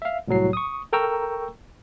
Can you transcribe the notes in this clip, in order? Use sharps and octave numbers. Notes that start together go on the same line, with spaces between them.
E5 F5
C2 A2 F#3 C7
C#6 D#6
A4 A#4 G5 A#5 C#6 E6